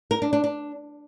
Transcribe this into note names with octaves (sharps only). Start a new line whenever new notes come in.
A#4
D4
D4
D4